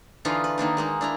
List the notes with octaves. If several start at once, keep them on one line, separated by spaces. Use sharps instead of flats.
D3 E3 D4 D#4 F4 F5
B4
D#3 A#3 D4 D#4
G#3 A#3 D#4
D4 E4 A#5